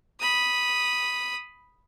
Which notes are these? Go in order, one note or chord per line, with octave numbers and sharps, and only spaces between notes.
B5 D#6